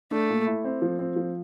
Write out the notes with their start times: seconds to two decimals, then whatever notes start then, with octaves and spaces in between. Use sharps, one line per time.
0.11 A3 D4
0.30 A#2
0.47 E4
0.65 C4
0.82 F3
0.99 C4
1.16 F3